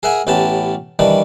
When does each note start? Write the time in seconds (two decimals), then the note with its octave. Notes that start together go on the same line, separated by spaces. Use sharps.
0.03 G#4 A#4 E5 F#5 G#5
0.27 A1 A2 B3 C#4 G4 A5
0.99 D#3 E3 G3 D4